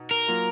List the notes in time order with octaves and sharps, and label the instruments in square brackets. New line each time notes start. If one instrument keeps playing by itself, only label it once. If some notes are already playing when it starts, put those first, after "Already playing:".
Already playing: [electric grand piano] B2 D#4
[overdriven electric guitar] A#4
[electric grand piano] F#3 A#3 F4